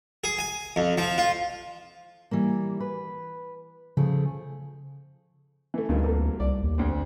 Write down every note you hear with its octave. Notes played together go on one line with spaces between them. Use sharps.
G#4
G#5
F2
F3
F4
E3 G3 A#3
B4
C#3 F3 A3 G#4
E3 A3
D2 G2 D#3 F4
C2 A#3 A4
C2 D5
D#2
D2 C4